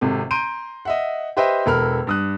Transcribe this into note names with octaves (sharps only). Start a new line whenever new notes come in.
G#1 C3 A4
A#5 C6 G6 D7 D#7
D#5 E5 F#5
G4 B4 C5 D#5 E5 G5
E1 A4 A#4 B5 F6
G2 D#6 F#6